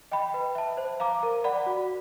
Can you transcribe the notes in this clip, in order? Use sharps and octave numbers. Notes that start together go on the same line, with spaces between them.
D#5 G5 B5
B4
E5 A5
C5
F5 A#5 D6
A#4
D5 F#5 B5
F#4